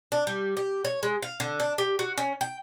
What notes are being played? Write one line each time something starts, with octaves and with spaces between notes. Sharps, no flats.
D4
G3
G4
C#5
G#3
F5
D3
D4
G4
F#4
C#4
G5